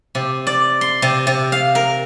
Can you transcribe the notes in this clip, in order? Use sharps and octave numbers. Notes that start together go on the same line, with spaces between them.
C3
D5
C6
C3
C3
F5
A#4